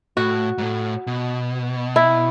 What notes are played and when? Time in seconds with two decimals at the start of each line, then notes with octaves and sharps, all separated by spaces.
0.17 A2 F#4
0.58 G#2
0.62 A2
1.07 B2
1.96 E4